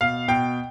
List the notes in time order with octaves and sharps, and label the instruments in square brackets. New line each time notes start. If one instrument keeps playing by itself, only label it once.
[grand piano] B2 F5
B2 G5